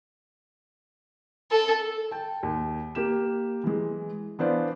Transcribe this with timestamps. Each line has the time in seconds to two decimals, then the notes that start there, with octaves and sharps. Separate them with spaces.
1.51 A4
2.11 G5 A5
2.43 D#2
2.95 A#3 G4 E7
3.64 E3 G#3
4.39 E3 B3 D4 C5 D5 F5